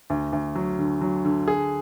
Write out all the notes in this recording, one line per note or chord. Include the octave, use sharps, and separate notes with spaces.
D2
D2
F#3
D3
F#3
D3
G#4